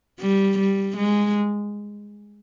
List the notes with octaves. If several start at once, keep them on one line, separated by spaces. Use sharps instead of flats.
G3
G3
G#3